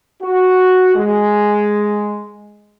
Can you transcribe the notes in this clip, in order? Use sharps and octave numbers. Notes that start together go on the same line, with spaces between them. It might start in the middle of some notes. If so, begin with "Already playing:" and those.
F#4
G#3